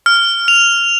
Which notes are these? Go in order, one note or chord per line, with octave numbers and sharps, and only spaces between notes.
F6
F7